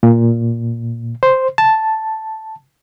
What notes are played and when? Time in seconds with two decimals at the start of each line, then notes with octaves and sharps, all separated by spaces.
0.03 A#2
1.23 C5
1.58 A5